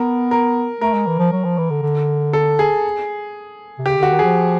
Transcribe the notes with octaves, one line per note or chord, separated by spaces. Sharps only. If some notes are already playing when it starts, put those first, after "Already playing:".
Already playing: B3 A#4
A#4
A3 A#4
G#3
E3
F3
F#3
F3
E3
D3
D3
A4
G#4
C3
C#3 G4
D3 F#4
D#3
F3 G#4